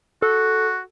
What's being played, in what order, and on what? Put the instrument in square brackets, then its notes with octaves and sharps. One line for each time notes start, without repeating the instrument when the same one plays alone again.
[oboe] F#4 [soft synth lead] A4